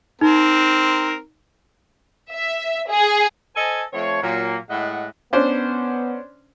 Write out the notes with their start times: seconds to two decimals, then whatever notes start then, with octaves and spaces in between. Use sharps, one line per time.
0.21 C4 D#4 A#4
2.32 E5
2.89 G#4
3.56 A4 C5 D#5 G#5
3.93 F3 A3 C4 C#5
4.23 A#2 F#3 A#3
4.69 A2 G#3 D#5 E5 F#5
5.33 B3 C#4 D4 C5